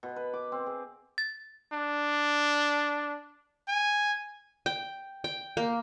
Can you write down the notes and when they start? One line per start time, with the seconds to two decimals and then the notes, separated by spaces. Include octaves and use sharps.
0.03 B2
0.16 B4
0.34 D6
0.52 C4
0.66 G#4
1.18 A6
1.73 D4
3.68 G#5
4.66 G5
5.24 G5
5.57 A#3